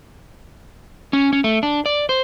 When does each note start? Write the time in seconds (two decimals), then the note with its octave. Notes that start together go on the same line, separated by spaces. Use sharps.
1.13 C#4
1.33 C#4
1.44 A3
1.63 D4
1.86 D5
2.09 C5